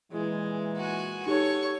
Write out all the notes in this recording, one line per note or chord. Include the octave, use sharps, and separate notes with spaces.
A#2 E3 G#3
F#4 G#5
D#4 G4 A4 C#5 C#6